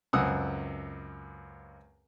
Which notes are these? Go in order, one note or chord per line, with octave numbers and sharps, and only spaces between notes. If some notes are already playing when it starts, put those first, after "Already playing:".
C#2 F#2 C4 F#5 D#6 E6